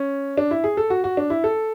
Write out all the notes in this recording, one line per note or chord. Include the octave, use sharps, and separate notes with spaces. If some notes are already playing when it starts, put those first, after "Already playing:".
Already playing: C#4
D4
E4
G#4
A4
F#4
F#4
D4
E4
A4